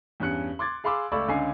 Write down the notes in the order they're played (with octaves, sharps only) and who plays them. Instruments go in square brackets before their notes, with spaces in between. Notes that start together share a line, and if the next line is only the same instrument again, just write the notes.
[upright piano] E2 G2 C#4 F#6 C#7
C6 D6 G#6 A6
G#4 F5 B5 C6 D6 E6
C#2 A3 D5 B5 C#6 E6
C#2 D3 C#4 D#5 G#5 C7